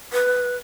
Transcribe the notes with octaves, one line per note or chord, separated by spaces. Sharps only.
B4